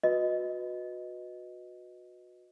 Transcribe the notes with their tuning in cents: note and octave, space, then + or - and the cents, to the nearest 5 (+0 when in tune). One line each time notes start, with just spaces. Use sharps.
F#4 -25 B4 +0 D#5 +0